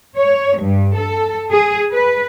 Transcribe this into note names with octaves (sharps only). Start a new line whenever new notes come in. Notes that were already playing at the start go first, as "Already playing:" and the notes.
C#5
G2
A4
G#4
B4